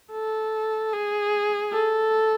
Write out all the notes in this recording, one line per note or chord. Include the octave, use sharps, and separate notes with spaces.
A4
G#4
A4